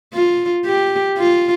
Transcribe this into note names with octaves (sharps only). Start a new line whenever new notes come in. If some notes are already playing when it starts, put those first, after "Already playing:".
F4
G4
F4